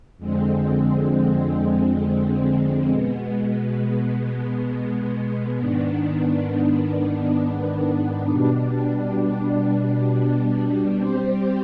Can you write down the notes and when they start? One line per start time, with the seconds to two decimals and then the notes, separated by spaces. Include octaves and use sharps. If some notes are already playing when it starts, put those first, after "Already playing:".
0.18 F2 D3 G#3 C4
2.88 B2 G#3 B3
5.58 G#2 D#3 B3 D4
8.29 B2 G3 D4
10.98 G3 C4 G4 C5